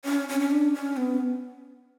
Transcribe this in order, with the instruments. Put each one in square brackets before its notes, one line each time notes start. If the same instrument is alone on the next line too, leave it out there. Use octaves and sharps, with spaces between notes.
[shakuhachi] C#4
C#4
C#4
D4
C#4
B3